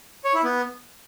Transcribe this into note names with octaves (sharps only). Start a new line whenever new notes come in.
C#5
E4
B3